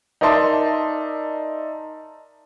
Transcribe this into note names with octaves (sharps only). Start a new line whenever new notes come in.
D#4 A#4 D5 E5 A5 C6